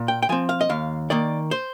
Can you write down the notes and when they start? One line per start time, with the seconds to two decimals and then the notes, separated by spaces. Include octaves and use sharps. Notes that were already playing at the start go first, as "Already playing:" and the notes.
Already playing: A#2
0.08 G5
0.22 G5
0.29 F3 C4 G#5
0.49 F5
0.61 D#5
0.70 D#2 F5
1.10 D#3 A#3 D5
1.51 C5